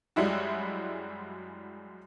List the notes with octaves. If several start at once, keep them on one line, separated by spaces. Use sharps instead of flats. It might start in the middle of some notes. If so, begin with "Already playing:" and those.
F#2 G3 G#3 E4 F#4